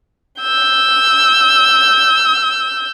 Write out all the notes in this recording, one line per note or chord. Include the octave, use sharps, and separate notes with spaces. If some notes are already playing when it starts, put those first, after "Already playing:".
E6 G6